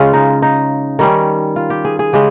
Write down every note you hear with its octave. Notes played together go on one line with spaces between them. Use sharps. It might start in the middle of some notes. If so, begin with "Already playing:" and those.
Already playing: C#3 G#3 C#4 F4
D#4
D#4
D#3 G3 C#4
F4
G4
G#4
G#4
C#3 G#3 G4